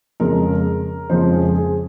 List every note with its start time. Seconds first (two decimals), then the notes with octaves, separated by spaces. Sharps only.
0.20 F2 C#3 F3 G#3 A#4
1.10 F2 C#3 F3 G#3 C5
1.32 G#4
1.54 G#4